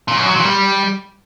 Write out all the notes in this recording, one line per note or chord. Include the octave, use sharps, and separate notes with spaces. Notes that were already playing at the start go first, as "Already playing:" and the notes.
A#2
F#2
F#3
A#2
G3